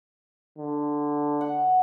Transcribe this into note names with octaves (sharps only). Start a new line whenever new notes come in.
D3
F#5